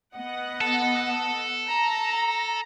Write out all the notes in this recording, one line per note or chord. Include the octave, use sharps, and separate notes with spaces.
B3 D#5 F#5
A4
A#5